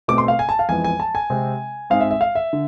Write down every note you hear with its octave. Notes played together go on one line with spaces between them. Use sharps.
B2 A3 C4 D6
C6
F5
G#5
A5
F5
F2 E3 G#3 B3 G#5
G#5
A5
G#5
C3 G#3 C4
G#2 G#3 C4 F5
E5
E5
F5
E5
D3